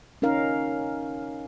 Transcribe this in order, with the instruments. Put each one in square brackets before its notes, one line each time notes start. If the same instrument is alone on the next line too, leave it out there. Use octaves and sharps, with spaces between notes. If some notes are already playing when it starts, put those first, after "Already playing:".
[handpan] C#4 D#4 A#4 F5